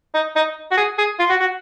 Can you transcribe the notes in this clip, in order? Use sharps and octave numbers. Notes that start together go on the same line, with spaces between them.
D#4
D#4
F#4
G#4
G#4
F4
F#4
F#4